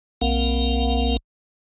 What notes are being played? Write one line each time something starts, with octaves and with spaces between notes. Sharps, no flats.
B1 A#3 C4 A#4 F5 F#5